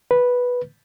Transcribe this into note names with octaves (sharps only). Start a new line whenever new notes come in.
B4